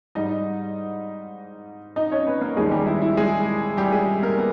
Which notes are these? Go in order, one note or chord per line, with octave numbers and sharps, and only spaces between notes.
G#2 G3 D#4 D#5
D#4 D#5
C#4 C#5
B3 B4
A#3 A#4
D#2 D#3 G3 G#3 G#4
G3 G4
E4
E4
G#3 G#4
G3 G4
G#3 G#4
A#3 A#4
B3